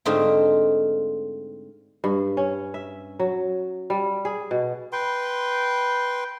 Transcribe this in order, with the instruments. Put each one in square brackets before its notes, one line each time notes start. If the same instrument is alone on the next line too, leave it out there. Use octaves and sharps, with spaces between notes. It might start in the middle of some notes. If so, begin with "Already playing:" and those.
[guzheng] G#2 D3 A3 C4 D#4 F4
[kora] G2
C#4
E5
F#3
G3
G#4
B2
[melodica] B4 G5 C6